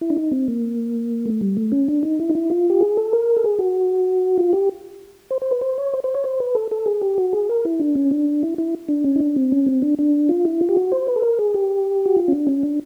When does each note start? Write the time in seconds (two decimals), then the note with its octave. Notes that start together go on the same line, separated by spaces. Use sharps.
0.01 E4
0.10 D4
0.17 D#4
0.31 C4
0.48 A#3
1.26 A3
1.41 G3
1.57 A3
1.72 C#4
1.88 D4
2.03 D#4
2.20 E4
2.30 D#4
2.35 E4
2.50 F4
2.70 G4
2.81 G#4
2.97 A4
3.13 A#4
3.37 A4
3.44 G#4
3.59 F#4
4.38 F4
4.53 G4
5.31 C5
5.42 C5
5.51 B4
5.61 C5
5.78 C#5
5.93 C5
6.04 C5
6.14 C#5
6.24 C5
6.40 B4
6.55 A4
6.71 A4
6.86 G#4
7.01 G4
7.18 F#4
7.33 G#4
7.49 A#4
7.65 E4
7.80 D4
7.95 C#4
8.11 D4
8.43 E4
8.58 E4
8.88 D4
9.04 C#4
9.16 D#4
9.20 D4
9.36 C4
9.52 C#4
9.66 C4
9.82 D4
9.99 D4
10.29 F4
10.45 E4
10.61 F4
10.69 G4
10.77 F#4
10.92 C5
11.07 B4
11.16 A4
11.22 A#4
11.39 G#4
11.54 G4
12.06 F#4
12.17 F4
12.28 C#4
12.32 D4
12.47 C#4
12.63 D4